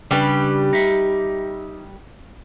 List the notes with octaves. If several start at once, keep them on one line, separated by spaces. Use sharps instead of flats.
C#3 G3 D4 G4 B4
D#4 E5